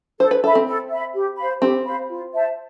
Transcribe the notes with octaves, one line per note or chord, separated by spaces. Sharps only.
A4 C5
B4
A4 E5 B5
C4
A4
E5 B5
G4
C5 F5 B5
C4 G4
C5 F5 B5
F4
C5 E5 A5